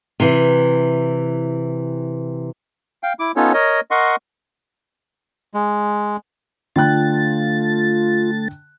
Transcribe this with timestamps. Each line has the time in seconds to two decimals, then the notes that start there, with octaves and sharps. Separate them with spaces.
0.20 C3 E3
3.03 F5 G5
3.20 E4 D6
3.36 B3 C#4 D#4 F4 A4 C#5
3.54 A#4 C#5 D#5
3.91 A#4 D#5 F#5 C6 C#6
5.54 G#3
6.76 D3 A3 F4 G5 F#6 A6